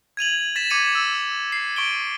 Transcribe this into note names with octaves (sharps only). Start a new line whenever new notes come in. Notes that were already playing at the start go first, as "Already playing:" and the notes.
G#6 D#7 F7 F#7
A6 B6 E7
D6 G#6 C#7 D#7
E6
C7
C#6 D7 G7